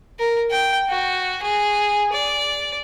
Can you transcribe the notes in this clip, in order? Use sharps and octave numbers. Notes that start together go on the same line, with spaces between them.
A#4
G5
F#4
G#4
D5